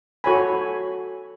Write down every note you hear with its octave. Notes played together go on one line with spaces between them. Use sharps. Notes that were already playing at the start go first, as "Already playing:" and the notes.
F#4 A4 C#5 G#5 B5